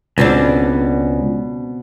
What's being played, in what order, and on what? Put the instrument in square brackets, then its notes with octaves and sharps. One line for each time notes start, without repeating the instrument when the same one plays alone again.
[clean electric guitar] C#2 [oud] B2 C4 D4